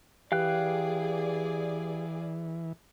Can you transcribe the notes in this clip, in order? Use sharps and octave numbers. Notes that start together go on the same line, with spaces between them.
E3 G4 G#4 B4 D5 F5 G5 F#6